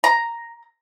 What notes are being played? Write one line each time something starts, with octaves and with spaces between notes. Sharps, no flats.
A#5